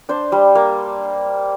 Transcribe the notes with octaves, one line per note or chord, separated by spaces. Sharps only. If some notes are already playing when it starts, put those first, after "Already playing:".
D4 C5
G3
A#3